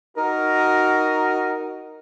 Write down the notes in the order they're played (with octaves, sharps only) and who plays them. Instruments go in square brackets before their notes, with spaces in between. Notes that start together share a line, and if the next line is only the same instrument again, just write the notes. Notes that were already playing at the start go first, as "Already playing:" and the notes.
[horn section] D#4 F#4 A#4